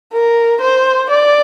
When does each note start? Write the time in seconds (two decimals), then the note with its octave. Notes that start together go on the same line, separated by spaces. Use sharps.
0.13 A#4
0.61 C5
1.10 D5